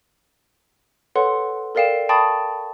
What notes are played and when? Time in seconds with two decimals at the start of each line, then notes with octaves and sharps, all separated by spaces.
1.15 A4 B4 C#5 F#5 C6
1.75 A4 A#4 D5 F5 G5 E7
2.09 G5 A5 B5 C#6 D#6 A6